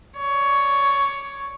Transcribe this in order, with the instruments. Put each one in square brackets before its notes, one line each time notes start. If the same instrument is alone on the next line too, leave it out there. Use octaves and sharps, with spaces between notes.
[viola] C#5 D5